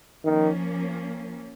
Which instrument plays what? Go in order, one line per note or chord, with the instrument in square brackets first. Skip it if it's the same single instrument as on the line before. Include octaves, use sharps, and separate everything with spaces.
[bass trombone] D#3 [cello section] F3 A#3 C#4